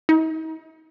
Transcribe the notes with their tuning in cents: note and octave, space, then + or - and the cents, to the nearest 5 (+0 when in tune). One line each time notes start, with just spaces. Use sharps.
D#4 +45